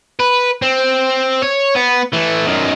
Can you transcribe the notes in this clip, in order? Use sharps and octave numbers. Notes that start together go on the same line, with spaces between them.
B4
C4
C#5
B3
E3 A3
F#2 D#3